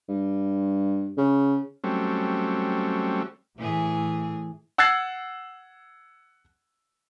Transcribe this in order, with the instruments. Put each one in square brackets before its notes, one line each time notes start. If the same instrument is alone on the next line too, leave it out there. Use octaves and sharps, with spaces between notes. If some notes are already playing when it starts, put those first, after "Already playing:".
[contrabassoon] G2
C#3
[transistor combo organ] F#3 G3 A3 C4 C#4
[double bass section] A2 [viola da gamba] E3 G#4
[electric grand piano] F#5 E6 F#6 G#6 A6 C7